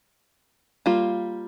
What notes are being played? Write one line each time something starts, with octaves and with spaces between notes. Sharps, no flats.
G3 A#3 F4